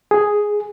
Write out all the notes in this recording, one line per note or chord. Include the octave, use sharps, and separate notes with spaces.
G#4